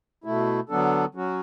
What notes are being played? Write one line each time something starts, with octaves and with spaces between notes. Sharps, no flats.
B2 A3 E4
D3 F#3 B3 D4 A4
F#3 C#4 F#4